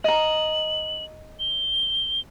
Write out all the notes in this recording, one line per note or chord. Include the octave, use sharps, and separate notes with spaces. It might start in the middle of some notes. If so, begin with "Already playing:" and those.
D#5 A#5 F#7
G7